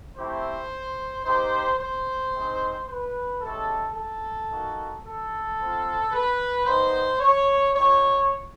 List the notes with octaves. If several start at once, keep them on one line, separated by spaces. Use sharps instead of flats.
A3 C4 E4 G4 C5
A#3 D#4 G4 C5
C5
G#3 C4 D#4
B4
G#3 C#4 E4 G4 A4
A4
A#3 D#4 F#4
A4
C4 F4
B4
G3 B3 D#4 C5
C#5
B3 D#4 G4 C#5